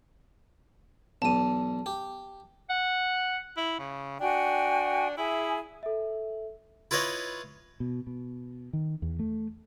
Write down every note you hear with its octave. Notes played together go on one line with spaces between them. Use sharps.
B1 E2 A5 D#7
G4
F#5
E4
C#3
D4 F#4 G5 G#5
E4 G#4 E5 G#5
A4 E5
E4 F4 B4 C#5 D#5
B2
B2
D#3
E2
A3